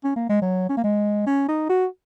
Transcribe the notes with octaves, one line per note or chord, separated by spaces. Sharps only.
C#4
A#3
G#3
F#3
C#4
A#3
G#3
C#4
D#4
F#4